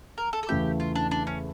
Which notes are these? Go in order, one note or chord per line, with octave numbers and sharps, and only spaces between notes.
A#4
A4
A4
E2 C#3 E3 A3 E4 G4
F4
D4
D4
C#4